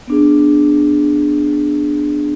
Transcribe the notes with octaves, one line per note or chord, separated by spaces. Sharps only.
B3 D4 G#4